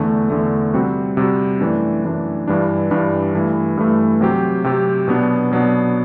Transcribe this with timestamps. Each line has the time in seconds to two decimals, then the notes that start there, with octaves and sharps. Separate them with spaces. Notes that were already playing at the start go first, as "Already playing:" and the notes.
Already playing: E2 D3 A3
0.30 E2 D3 A3
0.74 C3 G3 C4 F#4
1.17 C3 G3 C4 F#4
1.61 F#2 E3 A3 D4
2.04 F#2 E3 A3 D4
2.48 G2 E3 G3 D4
2.91 G2 E3 G3 D4
3.34 G2 E3 A3
3.77 G2 E3 A3
4.21 C3 F#3 C4 G4
4.64 C3 F#3 C4 G4
5.08 B2 F#3 B3 D4
5.51 B2 F#3 B3 D4